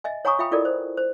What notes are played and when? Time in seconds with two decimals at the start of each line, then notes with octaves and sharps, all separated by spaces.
0.04 D#5 E5 G#5
0.25 C#5 F#5 G#5 A#5 C#6 D#6
0.39 F4 E5 F5 G5 B5 D#6
0.51 E4 F4 A4 A#4 D5 D#5
0.65 C5
0.97 C5